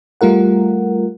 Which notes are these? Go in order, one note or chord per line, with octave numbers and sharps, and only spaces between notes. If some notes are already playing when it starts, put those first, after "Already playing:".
G3 A3 F4 A#4 F#5